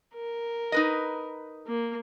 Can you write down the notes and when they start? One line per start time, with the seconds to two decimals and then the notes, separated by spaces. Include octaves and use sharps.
0.14 A#4
0.72 D#4 B4 D#5
1.67 A#3